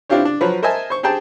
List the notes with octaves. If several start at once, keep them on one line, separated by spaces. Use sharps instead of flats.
C4 D4 E4 F4 G4 C#5
D4
F3 F#3 B4
A#4 C5 D#5 E5 G#5 A5
C5 C#6
G4 G#4 C5 G5 A5